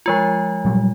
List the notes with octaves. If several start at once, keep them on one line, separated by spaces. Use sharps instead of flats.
F3 G#3 F4
A#2 F#3 G3